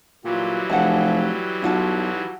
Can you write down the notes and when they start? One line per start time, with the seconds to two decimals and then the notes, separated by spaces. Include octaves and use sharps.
0.25 A#2 E3 F#3 G3
0.70 F1 F#5 A5
1.62 B1 F4 F#5 A5